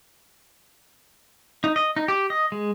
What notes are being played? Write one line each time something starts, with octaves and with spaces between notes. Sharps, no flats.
D#4
D#5
D#4
G4
D#5
G#3